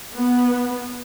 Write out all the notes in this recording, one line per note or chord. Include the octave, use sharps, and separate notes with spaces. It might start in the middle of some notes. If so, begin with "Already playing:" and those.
B3